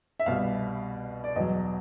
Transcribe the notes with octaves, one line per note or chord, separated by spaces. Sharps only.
E5
C2 B2 G3 F5
D5
E2 B2 F#3 D#5